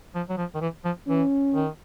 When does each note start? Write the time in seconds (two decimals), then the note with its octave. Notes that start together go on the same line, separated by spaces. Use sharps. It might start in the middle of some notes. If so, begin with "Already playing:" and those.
0.15 F3
0.29 F#3
0.37 F3
0.55 D#3
0.61 E3
0.84 F3
1.07 E3 C#4
1.54 D#3